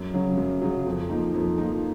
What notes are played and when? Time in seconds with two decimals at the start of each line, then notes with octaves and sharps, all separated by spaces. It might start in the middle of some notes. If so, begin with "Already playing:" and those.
Already playing: F#2
0.14 C#3 F#3
0.38 F#2
0.62 C#3 F#3
0.86 F2
1.10 F3 A#3 D#4
1.34 F2
1.58 F3 A#3 D#4